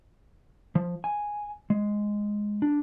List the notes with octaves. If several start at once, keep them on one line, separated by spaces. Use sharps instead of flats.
F3
G#5
G#3
D4